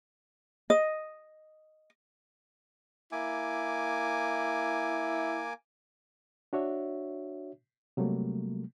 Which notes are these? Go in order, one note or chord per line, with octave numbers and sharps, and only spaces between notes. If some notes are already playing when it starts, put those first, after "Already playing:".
D#5
A#3 E4 G#5 D6
D4 F#4 C#5 E5
C3 F#3 G3 A3 A#3